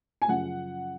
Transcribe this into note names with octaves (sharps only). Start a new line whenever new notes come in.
G#5
F#2 C#3 F3 F#5